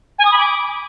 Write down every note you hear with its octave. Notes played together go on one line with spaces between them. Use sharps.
G#5
D#6
B5
D6